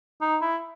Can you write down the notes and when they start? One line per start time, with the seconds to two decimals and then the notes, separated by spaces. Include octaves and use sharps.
0.21 D#4
0.42 E4